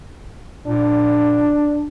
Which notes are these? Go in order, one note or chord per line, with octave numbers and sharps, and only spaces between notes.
A#2 D4